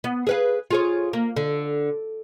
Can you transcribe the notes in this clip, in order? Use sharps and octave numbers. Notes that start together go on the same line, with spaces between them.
B3
G#4 B4 F5
F4 G#4 C#5
A#3
D3